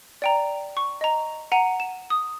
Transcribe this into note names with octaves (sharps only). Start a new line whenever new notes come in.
D5 G5 A#5
C#6
D#5 A#5
F#5 A#5 D#7
E7
D#6